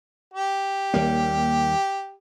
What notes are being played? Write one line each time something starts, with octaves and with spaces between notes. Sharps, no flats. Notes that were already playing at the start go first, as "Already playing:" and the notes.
G4
D#2 G3 A#3